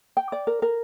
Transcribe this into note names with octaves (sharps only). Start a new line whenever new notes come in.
G5
D5
A#4
A#4